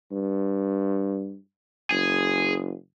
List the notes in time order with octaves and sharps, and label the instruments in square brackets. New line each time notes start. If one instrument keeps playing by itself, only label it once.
[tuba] G2
[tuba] F#1 [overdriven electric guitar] G#4